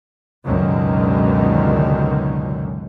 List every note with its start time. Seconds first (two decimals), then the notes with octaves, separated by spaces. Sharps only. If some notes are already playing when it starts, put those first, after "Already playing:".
0.43 C#2 F#2 B2 D3 D#3